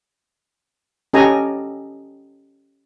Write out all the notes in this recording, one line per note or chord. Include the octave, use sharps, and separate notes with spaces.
C#4 G4 A4 D#5 G#5 A#5